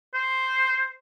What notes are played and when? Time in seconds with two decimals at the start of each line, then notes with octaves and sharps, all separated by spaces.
0.14 C5